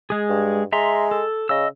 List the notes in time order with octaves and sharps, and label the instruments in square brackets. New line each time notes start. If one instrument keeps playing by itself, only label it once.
[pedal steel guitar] G#3 G#4
[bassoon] G2
[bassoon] G#3 [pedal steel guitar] E5 A#5 C6
[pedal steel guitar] A4
[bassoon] C#3 [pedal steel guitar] D#5 E6